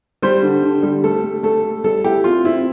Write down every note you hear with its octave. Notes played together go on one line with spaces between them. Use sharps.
G3 C5
D3
D3
G3
A3 A4
A3
A3 A4
A3
G3 A4
E4 G4
C4 F4
C4 E4